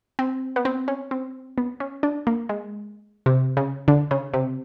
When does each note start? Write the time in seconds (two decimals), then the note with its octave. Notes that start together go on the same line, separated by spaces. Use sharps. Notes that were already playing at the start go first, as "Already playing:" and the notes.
0.19 C4
0.56 B3
0.65 C4
0.88 C#4
1.11 C4
1.58 B3
1.80 C#4
2.03 D4
2.27 A#3
2.49 G#3
3.26 C3
3.57 C#3
3.88 D3
4.11 C#3
4.34 C3